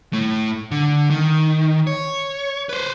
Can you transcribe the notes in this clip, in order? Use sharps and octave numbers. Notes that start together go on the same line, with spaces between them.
A2 A3
D3
D#3
C#5
B4 C5